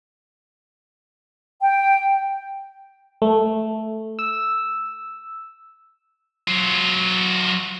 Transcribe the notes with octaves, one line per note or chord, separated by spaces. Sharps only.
G5
A3
E6
F#3 F4